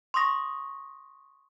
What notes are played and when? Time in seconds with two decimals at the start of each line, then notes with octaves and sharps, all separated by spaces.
0.14 C6 C#6 D#6 A#6